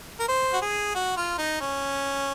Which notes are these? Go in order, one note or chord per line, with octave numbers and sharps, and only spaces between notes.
A#4
C5
F#4
G#4
F#4
F4
D#4
C#4